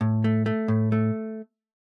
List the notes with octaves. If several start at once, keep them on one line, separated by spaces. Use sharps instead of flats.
A2
A3
A3
A2
A3